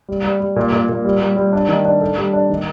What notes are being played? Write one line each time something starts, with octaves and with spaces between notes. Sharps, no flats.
G3
G3
G3
A#2
A#2
A#2
G3
G3
G3
D4
D#3
D4
A4
G3
D4
D#3